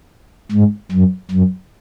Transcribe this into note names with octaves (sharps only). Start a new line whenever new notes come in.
G#2
F#2
F#2